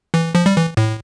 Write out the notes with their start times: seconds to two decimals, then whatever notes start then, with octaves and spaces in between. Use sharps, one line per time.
0.14 E3
0.35 F3
0.46 G3
0.56 E3
0.77 A2